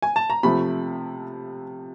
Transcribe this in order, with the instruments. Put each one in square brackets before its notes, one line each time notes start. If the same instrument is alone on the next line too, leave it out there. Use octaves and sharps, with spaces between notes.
[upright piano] G#5
A5
A#5
C3 F3 A3 B5